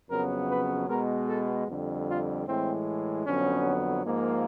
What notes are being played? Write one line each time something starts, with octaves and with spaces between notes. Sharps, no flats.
F2 C#3 F#3 B3 A#4
B4
B2 G#3 B3 A#4
A4
F2 D3 G3
F4
A2 E3 G#3 C4
F2 D3 F#3 B3 C#4
G#2 F3 A#3